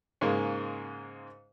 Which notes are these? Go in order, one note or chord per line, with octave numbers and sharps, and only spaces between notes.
G#2 C#3 G#3 A#3